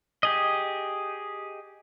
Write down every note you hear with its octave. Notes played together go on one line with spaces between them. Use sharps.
G4 G#4 D#5